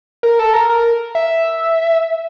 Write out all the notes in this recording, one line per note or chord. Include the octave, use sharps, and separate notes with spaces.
A#4
A4
A#4
A#4
E5